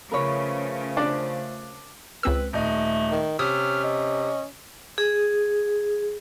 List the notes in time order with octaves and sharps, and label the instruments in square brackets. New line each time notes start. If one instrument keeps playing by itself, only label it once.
[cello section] C#3 C#4 [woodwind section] F3 A3 [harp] A#4 B4 C#5
[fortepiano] D4
[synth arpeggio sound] C#2 C4 E6 [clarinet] B4
[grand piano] D#1 D#4 [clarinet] A3
[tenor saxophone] D#3
[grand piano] C3 [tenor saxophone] C#4 [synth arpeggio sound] D#6 [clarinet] F6
[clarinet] D#5
[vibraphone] G#4